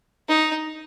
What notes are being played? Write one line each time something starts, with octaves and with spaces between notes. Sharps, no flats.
D#4